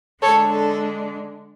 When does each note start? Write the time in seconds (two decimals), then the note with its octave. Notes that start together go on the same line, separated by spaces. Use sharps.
0.22 D3 G#3 D4 A4 C#5
0.51 A4